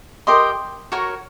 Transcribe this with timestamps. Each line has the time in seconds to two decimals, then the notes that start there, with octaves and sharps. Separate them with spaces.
0.27 G4 A#4 D#5 C6
0.92 F#4 A#4 C#5